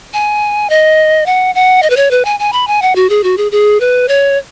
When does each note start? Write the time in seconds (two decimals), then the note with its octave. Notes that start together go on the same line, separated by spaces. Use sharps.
0.13 G#5
0.70 D#5
1.26 F#5
1.55 F#5
1.83 D#5
1.90 B4
1.97 C#5
2.11 B4
2.25 G#5
2.40 G#5
2.53 B5
2.67 G#5
2.82 F#5
2.96 F#4
3.10 G#4
3.24 F#4
3.38 G#4
3.52 G#4
3.80 B4
4.08 C#5